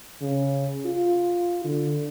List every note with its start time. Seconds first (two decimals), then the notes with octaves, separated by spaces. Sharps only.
0.21 C#3
0.86 F4
1.65 D3